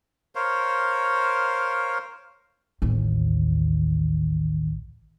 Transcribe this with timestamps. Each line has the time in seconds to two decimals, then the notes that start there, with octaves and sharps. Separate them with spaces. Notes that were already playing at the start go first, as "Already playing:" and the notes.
0.35 A#4 C5 C#5 F5
2.82 A1 D#2